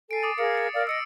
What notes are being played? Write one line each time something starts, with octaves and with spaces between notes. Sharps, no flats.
A4 G#5 C7 D7
D6 D#6 A6
G#4 A#4 F5 C#7
A6 C#7
A#4 D5 F5
D#5 E6 C#7 D7